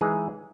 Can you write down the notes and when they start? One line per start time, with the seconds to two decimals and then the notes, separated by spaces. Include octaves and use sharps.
0.01 E3 G#3 D#4 G#4